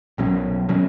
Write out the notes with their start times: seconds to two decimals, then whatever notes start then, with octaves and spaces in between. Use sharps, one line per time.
0.18 B1 B2 F#3 C#4
0.69 B2 F#3 C#4